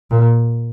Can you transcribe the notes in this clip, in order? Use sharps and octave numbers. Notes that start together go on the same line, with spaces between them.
A#2